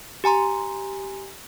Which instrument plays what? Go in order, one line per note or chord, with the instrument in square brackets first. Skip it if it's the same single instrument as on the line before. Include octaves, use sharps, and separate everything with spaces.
[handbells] G4 G#5 A#5 C6